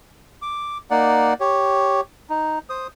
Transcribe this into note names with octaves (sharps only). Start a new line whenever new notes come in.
D6
A#3 D#4 D5 F#5
G4 C#5
D#4
C5 D#6